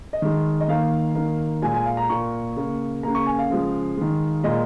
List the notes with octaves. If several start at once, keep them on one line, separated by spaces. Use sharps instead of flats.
D#5
D#3 G#3
D#5
D#3 A#3 F5
D#3 A#3
A#2 G#3 G#5
G#5
F5
A#5
A#2 A#3 C#6
C#3 A#3
C#3 A#3 A#5
C#6
G#5
F5
C#3 F3 G#3
D#3 G#3
A#2 G#3 D#5